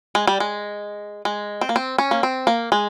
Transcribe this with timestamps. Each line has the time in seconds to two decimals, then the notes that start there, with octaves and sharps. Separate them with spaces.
0.15 G#3
0.27 G3
0.40 G#3
1.25 G#3
1.61 C4
1.69 A#3
1.76 C4
1.98 C#4
2.11 A#3
2.23 C4
2.47 A#3
2.72 G#3